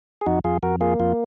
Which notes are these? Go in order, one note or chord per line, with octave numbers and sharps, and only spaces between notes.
G#4
F2 D#4 F#4
F2 F4 G#4
F2 F#4 A#4
A#3 F4 G#4
F2 F4